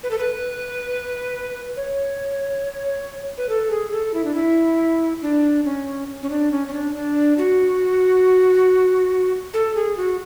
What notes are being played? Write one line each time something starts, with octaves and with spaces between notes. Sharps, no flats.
B4
A4
B4
C#5
B4
A4
G#4
A4
E4
D4
E4
D4
C#4
C#4
D4
C#4
C#4
D4
D4
F#4
A4
G#4
F#4